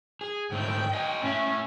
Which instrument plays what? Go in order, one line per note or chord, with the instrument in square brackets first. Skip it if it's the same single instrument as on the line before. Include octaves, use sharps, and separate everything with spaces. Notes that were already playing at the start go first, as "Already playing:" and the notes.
[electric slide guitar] G#4
[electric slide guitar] G#2 D3 A3 [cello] G5
[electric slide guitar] D#5 F5 G#5
[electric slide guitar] A2 E5 [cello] C#4